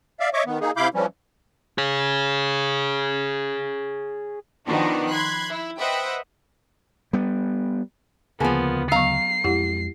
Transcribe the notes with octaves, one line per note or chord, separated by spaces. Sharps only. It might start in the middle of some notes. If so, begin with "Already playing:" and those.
D5 E5 F5
C#5 D#5 E5 C#6 D6
D#3 B3
A#3 D#4 G#4
C3 E4 F5 B5 D6 G6
E3 F3 G3 C#4
G#4 C#5
D#3 F3 B3 D4 D#4 F#4
B5 C6 F#6 G#6
E4
B4 C5 D#5 E5 F#5 G5
G3 B3
D2 C#3 F3 A#3 B3 G#4 G#5 A5
F#3 B3 F5 A#5 C#6 C7
F2 G#3 E4 G4 F#5